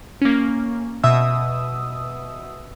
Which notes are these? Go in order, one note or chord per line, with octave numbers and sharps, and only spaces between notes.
A#3 C#4
B2 E5 D#6 E6